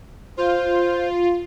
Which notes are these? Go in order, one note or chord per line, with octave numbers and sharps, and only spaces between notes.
F4 C5